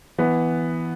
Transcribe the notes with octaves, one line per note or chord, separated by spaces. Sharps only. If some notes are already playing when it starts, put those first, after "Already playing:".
E3 B3